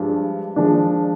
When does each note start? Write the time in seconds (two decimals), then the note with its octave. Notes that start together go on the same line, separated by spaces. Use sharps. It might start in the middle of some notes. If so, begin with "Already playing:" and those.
Already playing: G2 F3 G#3 D4
0.56 F3 G#3 D4